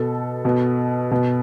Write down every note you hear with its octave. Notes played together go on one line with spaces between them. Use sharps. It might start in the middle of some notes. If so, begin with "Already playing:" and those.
Already playing: B2 A4
B2
B2